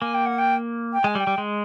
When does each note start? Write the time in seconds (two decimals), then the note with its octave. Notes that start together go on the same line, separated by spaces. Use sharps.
0.01 A#3 G#5
0.14 G5
0.26 F#5
0.38 G5
0.93 G5
1.04 G#3 G#5
1.15 G3
1.20 G5
1.27 G3
1.38 G#3